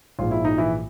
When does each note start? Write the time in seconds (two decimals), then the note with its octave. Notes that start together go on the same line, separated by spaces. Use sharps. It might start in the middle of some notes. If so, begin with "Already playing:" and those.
0.19 A#1 G#2 F3 G#3 F4
0.31 E4
0.45 D#4
0.58 E3 E4